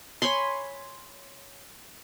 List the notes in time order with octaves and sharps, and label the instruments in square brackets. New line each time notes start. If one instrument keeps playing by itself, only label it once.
[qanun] C#5 G#5 B5 C6